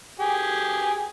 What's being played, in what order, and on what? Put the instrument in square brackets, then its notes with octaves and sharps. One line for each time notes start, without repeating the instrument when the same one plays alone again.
[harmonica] G4 G#4